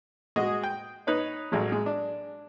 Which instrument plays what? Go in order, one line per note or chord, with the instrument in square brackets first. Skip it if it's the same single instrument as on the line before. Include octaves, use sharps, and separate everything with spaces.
[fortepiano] G#3 F#4 G#4 D#5
G5
D#4 B4 C#5
A1 F#3 G#3
G#3
D4